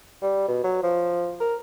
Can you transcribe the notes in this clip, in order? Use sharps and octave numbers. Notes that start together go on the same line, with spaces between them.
G3
B2
F#3
F3
A#4